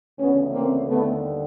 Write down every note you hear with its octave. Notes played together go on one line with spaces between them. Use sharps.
D2 C#3 E3 B3 C#4
A#3 C4
D#2 D3 G3 A3 B3